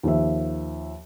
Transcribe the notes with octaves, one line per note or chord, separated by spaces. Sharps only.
D#2 F3 E5